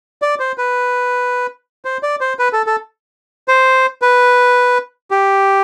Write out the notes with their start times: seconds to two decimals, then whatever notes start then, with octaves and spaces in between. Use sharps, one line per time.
0.22 D5
0.40 C5
0.58 B4
1.85 C5
2.03 D5
2.21 C5
2.39 B4
2.53 A4
2.67 A4
3.48 C5
4.02 B4
5.11 G4